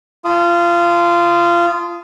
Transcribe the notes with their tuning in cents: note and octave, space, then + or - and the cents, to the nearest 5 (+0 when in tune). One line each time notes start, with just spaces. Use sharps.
F4 -20 A5 -15 D#6 +0